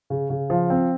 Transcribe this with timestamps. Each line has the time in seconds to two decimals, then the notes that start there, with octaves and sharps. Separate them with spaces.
0.10 C#3
0.30 C#3
0.50 F3
0.70 C4